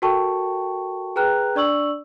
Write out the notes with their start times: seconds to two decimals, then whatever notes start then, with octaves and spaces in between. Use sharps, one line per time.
0.02 F#4 A4 A#4 G5 A5 C#6
1.16 G#4 B4 G5 A#5 F6 F#6
1.55 D4 D5 C#6 E6 F#7